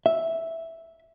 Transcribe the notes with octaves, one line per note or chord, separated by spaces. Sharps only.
E5